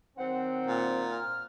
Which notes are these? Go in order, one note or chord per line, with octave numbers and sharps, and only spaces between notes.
D#3 F#3 C4 F#5
A#2
F6